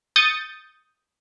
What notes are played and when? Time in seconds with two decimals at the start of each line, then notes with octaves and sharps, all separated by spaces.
0.16 D#6 G6 A6 C#7